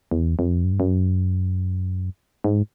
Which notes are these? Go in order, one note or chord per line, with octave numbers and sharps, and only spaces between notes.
E2
F2
F#2
G2
F#2
G#2